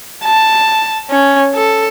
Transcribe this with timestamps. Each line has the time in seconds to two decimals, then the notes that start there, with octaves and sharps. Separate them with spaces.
0.24 A5
1.11 C#4
1.55 A4